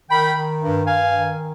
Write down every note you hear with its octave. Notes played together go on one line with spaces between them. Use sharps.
D#3 G5 B5
D#3
G2
G2 F5 G#5
D#3